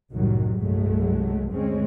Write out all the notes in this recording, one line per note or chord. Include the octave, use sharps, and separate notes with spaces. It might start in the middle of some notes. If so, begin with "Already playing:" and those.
C2 F#2 A2 D#3 F#3 G3
C2 G2 F#3 G#3 A3
D2 G#3 C4 C#4